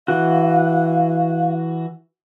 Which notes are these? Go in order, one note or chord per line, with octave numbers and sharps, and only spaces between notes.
E3 F#4 F5